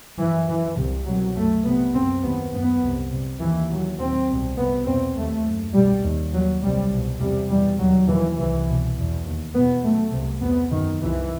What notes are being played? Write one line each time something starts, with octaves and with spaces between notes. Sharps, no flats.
F#2 E3
F#2 E3
C2 C3
C2 B2 F#3
F#2 A3
C2 C3 B3
F#2 C4
D#2 B3
F#2 B3
C2 C3
C2 C3
D#2 E3
D#2 F#3
D#2 C4
C2 B2
C2 C3 B3
E2 B2 C4
D#2 A3
F#2
C2 B2 G3
D#2
D#2 F#3
C2 C3 G3
C2 B2
E2 C3 G3
E2 B2 G3
D#2 F#3
D#2 E3
C2 C3 E3
C2 B2
E2 B2
D#2
E2 B2 B3
F#2 A3
C2 C3
E2 C3 B3
F#2 D#3
C2 C3 E3